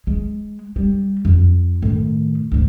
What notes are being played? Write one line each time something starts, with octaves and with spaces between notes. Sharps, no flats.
G#3
G3
F2
A2 D#3
D2 A2